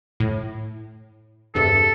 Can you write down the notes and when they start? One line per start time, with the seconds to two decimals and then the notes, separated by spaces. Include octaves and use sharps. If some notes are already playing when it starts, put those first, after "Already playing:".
0.20 A2
1.55 E2 G2 C3 A4